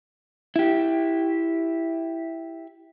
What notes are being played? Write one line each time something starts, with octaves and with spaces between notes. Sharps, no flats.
E4 G4